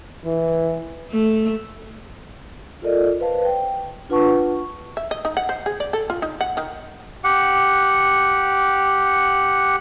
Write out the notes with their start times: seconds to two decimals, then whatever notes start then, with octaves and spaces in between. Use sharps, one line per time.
0.25 E3
1.11 A3
2.82 F4 A4 A#4 D5 D#5
3.20 B4 C5 F5 A5
3.45 G5
4.10 D4 F4 B4 F#5 A5 C#6
4.97 E5
5.11 D#5
5.25 D#4
5.37 F#5
5.49 C5
5.66 G#4
5.80 D5
5.93 A4
6.10 F4
6.22 D#4
6.41 F#5
6.57 D#3
7.24 G4 F#5